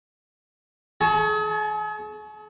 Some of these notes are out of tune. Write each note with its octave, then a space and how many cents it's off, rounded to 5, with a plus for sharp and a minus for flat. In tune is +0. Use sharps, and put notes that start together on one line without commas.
G#4 +40 A5 +0 C#6 +0